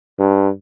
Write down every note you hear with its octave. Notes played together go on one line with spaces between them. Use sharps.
G2